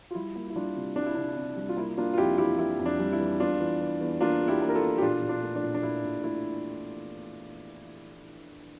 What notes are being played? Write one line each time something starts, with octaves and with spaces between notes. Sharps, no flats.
F4
G3 E4
A#3
E4
G3 D4 F4
C3
C2 D4
E4
C3 D4
C3
G3
F4
A#3 E4
A#3 D4 F4
F4
F2 E4 G4
E3 E4 G4
E3 E4
F2
D4
G3
E4
E3
E2 D4 F4
E3
E3
E2
A#3 D4 F4
E2
E4 G4
A#3
A#4
F4 A4
E2
G4
A#2 D4 F4
A#2
D4 F4
A3
D4
A#2
D4
A#2 E4
A#2
A3 E4